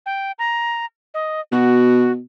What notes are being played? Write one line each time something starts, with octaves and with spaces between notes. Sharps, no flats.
G5
A#5
D#5
B2 F#4